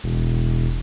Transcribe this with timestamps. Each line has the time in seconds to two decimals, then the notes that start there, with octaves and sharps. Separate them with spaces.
0.04 E1